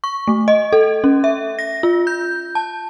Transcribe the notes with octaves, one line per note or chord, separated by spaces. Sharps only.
C#6
A3
D#5
A4
C#4
E5
A#6
F4
G6
A5